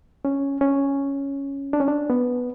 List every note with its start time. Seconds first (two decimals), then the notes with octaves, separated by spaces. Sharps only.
0.25 C#4
0.61 C#4
1.73 D4
1.80 C#4
1.88 D4
2.10 B3